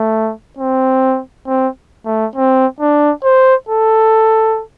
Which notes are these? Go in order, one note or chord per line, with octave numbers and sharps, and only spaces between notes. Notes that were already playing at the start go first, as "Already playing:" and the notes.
Already playing: A3
C4
C4
A3
C4
D4
C5
A4